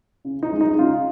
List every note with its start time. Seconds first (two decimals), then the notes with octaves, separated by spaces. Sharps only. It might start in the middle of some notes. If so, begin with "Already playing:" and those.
0.25 C#3
0.43 D#4
0.52 G#3
0.61 D#4
0.78 C#3 F4